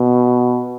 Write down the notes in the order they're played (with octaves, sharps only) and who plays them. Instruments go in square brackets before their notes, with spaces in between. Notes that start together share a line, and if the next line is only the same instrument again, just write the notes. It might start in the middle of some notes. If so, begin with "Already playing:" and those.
Already playing: [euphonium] B2